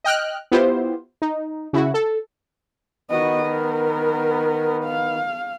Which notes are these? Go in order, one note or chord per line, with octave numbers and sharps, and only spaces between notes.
D#5 G5 F6 F#6
B3 E4 F4 G4 C5
D#4
C#3 E4 F#4
A4
D#3 B3 F#4 D#5
A#4
F5